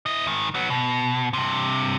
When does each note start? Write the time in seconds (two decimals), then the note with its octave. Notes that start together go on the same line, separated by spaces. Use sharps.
0.06 E4 D#5
0.27 G#2 D#3
0.54 F#3 B3
0.70 B2
1.33 G2 C3